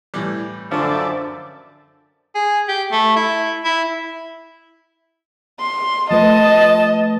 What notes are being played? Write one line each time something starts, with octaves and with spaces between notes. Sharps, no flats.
A2 E3 G3
F#2 D3 F3 D5 E5 A5
G#4
G4
A3
E4
E4
C6
F3 A3 B4 D#5 A5